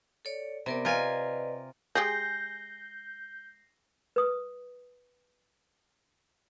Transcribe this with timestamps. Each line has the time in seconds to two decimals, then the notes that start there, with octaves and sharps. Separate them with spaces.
0.25 A4 C#5 D5
0.66 C3 B3 A#4 D5
0.85 F4 A#4 B4 D5 D#5 G#5
1.95 G#3 G4 G#4 G6 A#6 C7
4.16 B4 D#6